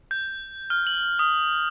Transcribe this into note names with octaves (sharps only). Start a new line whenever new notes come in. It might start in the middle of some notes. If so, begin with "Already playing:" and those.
G6
F6
F#7
D#6